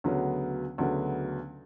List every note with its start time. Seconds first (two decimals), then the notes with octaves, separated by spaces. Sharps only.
0.04 D2 C#3 F#3 B3
0.78 D2 C#3 F#3 B3